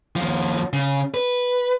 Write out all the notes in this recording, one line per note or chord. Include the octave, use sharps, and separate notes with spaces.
D#2 F3
C#3
B4